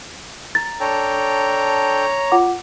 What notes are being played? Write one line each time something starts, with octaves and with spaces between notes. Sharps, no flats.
A#5 A6
D4 A4 C#5 G5 A#5
F4 F#5 D6